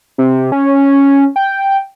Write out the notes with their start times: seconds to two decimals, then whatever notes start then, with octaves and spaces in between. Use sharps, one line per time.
0.18 C3
0.52 C#4
1.36 G5